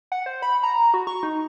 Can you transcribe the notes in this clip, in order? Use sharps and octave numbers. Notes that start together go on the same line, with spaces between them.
F#5
C5
B5
A#5
F#4
C#6
D#4